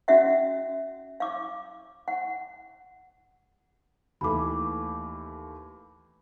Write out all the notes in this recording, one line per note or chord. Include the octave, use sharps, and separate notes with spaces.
C#4 F#4 E5 F#5
F5 D6
F#5
D#2 E3 A3 B5 D6